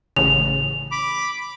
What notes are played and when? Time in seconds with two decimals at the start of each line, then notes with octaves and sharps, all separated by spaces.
0.16 A1 C#3 F7
0.92 B5 D6